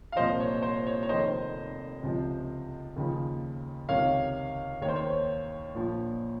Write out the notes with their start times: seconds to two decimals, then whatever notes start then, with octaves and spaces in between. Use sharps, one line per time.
0.12 F5
0.16 C2 A#2 F3 C5 D#5
0.40 C#5
0.62 C5
0.87 C#5
1.03 C#5
1.09 F1 F2 D#3 C5 D#5
2.03 C#2 C3 F3
2.96 D#2 C#3 F3
3.89 C#2 C3 D#3 C#5 F5
4.81 D#2 D#3 C#5
4.88 C5
4.96 C#5
5.75 A#1 A#2 F3